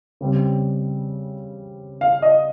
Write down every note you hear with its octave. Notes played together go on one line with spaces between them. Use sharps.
C#3 G3 C4
F5
D#5